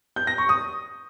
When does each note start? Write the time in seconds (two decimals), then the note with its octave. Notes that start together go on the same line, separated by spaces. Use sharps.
0.16 G6
0.27 A#6
0.38 C#6
0.49 D#6